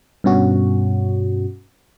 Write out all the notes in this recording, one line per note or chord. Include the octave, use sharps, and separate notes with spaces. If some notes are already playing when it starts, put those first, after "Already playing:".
G2 B2 C#4 F#4